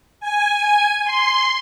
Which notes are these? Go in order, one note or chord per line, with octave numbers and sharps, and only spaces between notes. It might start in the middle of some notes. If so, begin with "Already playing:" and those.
G#5
C6